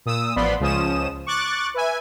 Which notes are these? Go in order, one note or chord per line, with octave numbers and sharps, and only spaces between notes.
A#2 D#6 E6
A1 F3 B3 D5 B5 C6
C#2 C#3 F3 C#4 D#6 E7
C#6 D6 F#6 A6
B4 E5 G#5